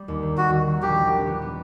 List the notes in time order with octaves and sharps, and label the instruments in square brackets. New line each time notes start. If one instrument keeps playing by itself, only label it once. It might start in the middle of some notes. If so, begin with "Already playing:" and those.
Already playing: [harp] G3
D#2
D#3
[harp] D#2 [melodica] F#4
[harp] D#3
D#3
[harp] A#1 [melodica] G4
[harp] A#1
A#1
B3
B3